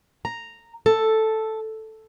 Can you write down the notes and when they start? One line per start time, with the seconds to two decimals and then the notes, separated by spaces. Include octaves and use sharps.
0.25 A#5
0.86 A4